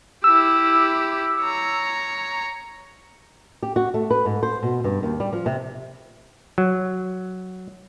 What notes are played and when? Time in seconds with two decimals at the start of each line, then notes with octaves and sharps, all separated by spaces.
0.24 E4 G4 E6
1.42 C#5 A#5
3.63 G4
3.76 F#4
3.94 A3
4.11 B4
4.25 G#2
4.43 C5
4.63 B2
4.84 G2
5.03 D#2
5.20 G3
5.33 F3
5.46 C3
6.58 F#3